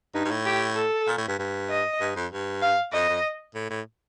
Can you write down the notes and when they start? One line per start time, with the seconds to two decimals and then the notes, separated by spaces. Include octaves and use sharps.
0.14 G2 D#4
0.25 G2
0.30 A2
0.46 G4
0.76 A4
1.07 A#2
1.17 A2
1.28 G2
1.39 G2
1.70 D#5
2.00 G2
2.16 F2
2.32 G2
2.62 F5
2.93 F2 D#5
3.09 F2
3.54 A2
3.70 A2